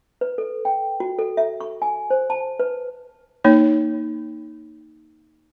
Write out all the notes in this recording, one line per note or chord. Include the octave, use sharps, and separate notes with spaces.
B4
A4
G5
F#4
A4
E5
C#6
G#5
C5
A5
B4
A#3 D#4 C#5